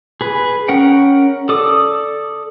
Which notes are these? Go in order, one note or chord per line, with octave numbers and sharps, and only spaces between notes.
G#4 B4
C#4 A#4 F#5 G5
A4 D5 D6 D#6